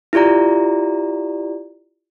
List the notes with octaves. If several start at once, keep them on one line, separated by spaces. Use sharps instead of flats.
E4 F4 G4 D5 A#5